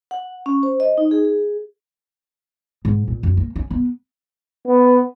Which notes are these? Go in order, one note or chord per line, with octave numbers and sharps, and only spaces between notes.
F#5
C#4
C5
D#5
D#4
G#4
G#4
G#2
A#2
F#2
A#3
C#4
B3
B3